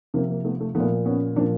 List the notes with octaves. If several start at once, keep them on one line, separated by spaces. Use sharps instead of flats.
C3 F3 A#3 C4
A#3
A3 B3
A3
F3 A3 B3
A#2
B3 C#4
A#2 F3 C4 D4